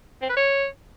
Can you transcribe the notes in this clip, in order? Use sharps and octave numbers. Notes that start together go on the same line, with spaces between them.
C4
B4
C#5